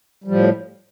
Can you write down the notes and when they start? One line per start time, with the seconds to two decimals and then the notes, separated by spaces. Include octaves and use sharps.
0.24 G3
0.28 F3
0.31 A2